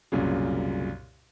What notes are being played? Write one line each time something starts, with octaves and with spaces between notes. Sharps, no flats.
C2 F#2 A#2 C#3